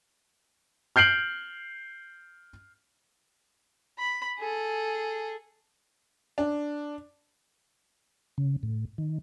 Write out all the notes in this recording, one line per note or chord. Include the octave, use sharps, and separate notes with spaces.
F6 G6 C7 D7 F#7
B5
G#4 A4
D4
C#3
A2
D#3